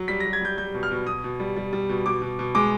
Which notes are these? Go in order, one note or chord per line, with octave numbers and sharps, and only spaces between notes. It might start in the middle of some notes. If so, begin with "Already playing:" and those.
Already playing: F#3
G3 B6
A#6
G3
G#6
G3 G6
G3 G6
B2
F6
B2
B2 D#6
B2
G3
G3
G3
B2
B2 D6
B2
B2
G#3 D6